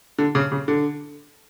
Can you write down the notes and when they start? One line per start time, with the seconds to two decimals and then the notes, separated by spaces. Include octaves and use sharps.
0.18 D3
0.35 C#3
0.52 C#3
0.68 D3